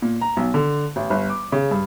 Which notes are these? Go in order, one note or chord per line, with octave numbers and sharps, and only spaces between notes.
A#2
A#5
B1
D3
A1
G1
D6
C#3
G2